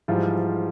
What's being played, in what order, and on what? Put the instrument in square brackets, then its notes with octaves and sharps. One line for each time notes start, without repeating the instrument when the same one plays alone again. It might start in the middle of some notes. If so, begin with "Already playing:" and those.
[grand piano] G#2 E3 F3 G3 F4